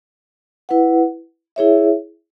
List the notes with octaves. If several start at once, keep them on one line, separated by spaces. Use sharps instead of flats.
E4 B4 F#5
E4 G#4 C#5 E5